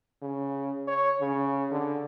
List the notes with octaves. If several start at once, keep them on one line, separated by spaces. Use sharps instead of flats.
C#3
C#5
C#3
D3